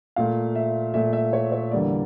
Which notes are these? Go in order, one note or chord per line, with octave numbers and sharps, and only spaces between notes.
A#2 A3 F5
E5
A#2 A3 E5
E5
C#5
C#5
E2 D3 G3 A#3 D5